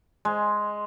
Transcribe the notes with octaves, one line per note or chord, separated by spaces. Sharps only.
G#3